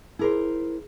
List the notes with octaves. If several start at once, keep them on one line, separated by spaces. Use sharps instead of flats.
D#4 E4 G#4 A#4 C5